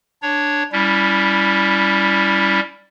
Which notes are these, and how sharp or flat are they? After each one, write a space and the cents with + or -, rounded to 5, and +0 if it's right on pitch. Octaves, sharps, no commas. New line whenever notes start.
D4 +0 C#5 +0
G3 +0 C#4 +30 E4 +0